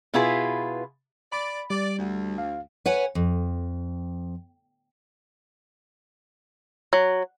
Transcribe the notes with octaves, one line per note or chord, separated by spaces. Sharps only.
B2 B3 E4 F4 G#4 B4
D5 B5
G3 D5
D2
F5
B4 C#5 F#5 G#5
F2
F#3